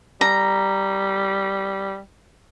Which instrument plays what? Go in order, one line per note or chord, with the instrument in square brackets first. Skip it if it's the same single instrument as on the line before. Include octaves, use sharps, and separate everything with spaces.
[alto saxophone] G3 [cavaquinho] A#5